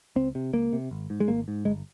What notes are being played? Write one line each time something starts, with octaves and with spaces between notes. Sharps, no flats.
C#2 C4
C3
C#2 A#3
C3
G#1
G#2
G#3
G#1 A#3
G#2
G1 G#3